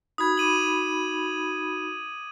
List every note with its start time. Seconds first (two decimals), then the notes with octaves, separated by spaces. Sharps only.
0.18 D#4 F#4 B5 D#6 G#6
0.38 D6 D#7 F#7